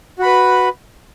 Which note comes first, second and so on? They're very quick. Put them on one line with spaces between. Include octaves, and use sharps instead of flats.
F#4 B5 B4